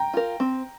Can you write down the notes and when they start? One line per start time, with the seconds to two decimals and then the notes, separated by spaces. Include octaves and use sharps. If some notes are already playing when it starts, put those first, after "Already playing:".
Already playing: G5 A#5
0.14 F4 A#4
0.40 C4